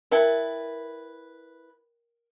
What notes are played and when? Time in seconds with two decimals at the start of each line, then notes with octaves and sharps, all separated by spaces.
0.11 E4 A#4 B4 D5 G5 A5